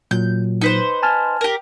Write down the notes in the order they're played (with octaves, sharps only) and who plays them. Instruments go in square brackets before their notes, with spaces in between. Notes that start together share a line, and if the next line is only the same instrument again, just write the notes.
[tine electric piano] A#2 F#3 [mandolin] G6
[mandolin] D#4 B4 C5
[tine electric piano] G#5 A5 F6
[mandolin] G4 A#4